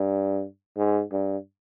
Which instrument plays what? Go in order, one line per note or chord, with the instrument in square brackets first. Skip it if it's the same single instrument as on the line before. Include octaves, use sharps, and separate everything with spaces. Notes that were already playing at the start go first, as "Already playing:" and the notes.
Already playing: [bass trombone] G2
G#2
G2